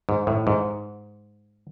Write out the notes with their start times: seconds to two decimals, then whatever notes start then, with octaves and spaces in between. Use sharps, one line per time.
0.09 G#2
0.27 A2
0.47 G#2